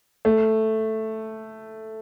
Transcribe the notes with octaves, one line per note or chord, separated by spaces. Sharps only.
A3